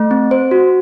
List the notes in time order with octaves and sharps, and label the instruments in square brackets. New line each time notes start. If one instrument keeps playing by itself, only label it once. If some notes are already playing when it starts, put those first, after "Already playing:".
Already playing: [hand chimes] A3
C4
C5
F#4